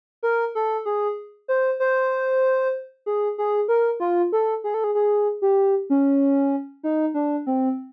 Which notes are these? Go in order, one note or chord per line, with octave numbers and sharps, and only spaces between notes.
A#4
A4
G#4
C5
C5
G#4
G#4
A#4
F4
A4
G#4
A4
G#4
G#4
G4
C#4
D#4
D4
C4